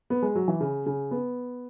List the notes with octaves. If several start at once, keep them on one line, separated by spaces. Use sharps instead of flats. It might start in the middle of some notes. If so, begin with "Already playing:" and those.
B3
G#3
F#3
E3
C#3
C#3
B3